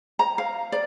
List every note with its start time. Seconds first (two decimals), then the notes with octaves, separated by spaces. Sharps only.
0.19 A#5
0.38 F5
0.72 D5